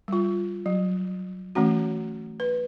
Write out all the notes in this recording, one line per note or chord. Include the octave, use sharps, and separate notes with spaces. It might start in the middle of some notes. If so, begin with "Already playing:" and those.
G3 F4
F#3
E3 A3 C#4 F#4
B4